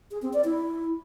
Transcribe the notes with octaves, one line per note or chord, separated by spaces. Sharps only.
G#4
C4
D5
E4